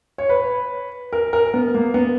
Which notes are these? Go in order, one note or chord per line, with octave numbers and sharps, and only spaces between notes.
C#5
B4
A#4
A#4
B3
A#3
B3